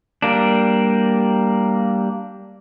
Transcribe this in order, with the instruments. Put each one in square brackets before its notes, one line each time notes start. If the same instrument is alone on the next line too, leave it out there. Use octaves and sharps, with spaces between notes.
[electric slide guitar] G3 A#3 D4